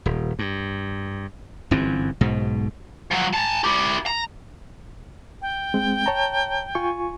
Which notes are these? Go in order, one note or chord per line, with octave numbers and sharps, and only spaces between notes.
D#1
G2
G1 F#2 E3 C4
B1 G#2 B2
F3 F#3
A5 A#5
E4 G4
A#5
G5
G#3 C4
C#5 A5 A#5
F4 G#5 C#6